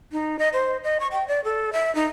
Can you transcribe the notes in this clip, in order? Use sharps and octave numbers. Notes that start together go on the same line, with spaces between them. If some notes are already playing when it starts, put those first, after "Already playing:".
D#4
D#5
C5
D#5
C#6
G5
D5
A4
E5
D#4